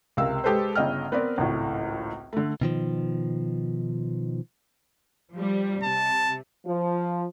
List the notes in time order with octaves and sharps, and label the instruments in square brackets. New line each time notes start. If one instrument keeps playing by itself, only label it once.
[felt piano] C#2 C3 A#4 F5 E6
G#3 G4 A4 B4 C5
G1 C#3 D#5 G5 F6
B3 C4 A#4 B4 D5
G#1 C#2 A2
D3 A3
[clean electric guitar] B2 D#3 F3
[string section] F3 G3
[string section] C3 [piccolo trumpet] A5
[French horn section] F3